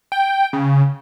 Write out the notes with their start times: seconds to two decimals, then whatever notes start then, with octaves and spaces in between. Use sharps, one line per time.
0.12 G5
0.53 C#3